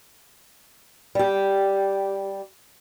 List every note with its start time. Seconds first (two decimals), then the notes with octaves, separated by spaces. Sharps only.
1.15 G3 G4